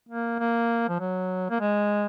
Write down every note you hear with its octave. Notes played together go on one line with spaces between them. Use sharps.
A#3
A#3
F3
F#3
A#3
G#3